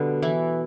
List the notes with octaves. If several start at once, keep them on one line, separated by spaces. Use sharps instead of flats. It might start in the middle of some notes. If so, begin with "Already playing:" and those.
Already playing: B2 D3 G3 B3 D4
E3 E4